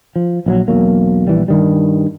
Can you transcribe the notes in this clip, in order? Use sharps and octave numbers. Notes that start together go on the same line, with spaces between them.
F3
A#1 E3 F#3
E1 B1 F#3 A#3
A#1 E3 G3
G2 D#3 G3